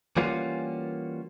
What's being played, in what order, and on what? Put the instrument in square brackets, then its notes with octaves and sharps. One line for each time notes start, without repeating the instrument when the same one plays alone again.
[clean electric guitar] E3 G3 A#3 C#4 F4 F#4